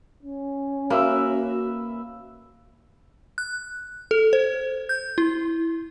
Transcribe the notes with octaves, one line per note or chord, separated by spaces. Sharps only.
C#4
A#3 F#4 B4 E5 E6
F#6
A4
C5
G6
E4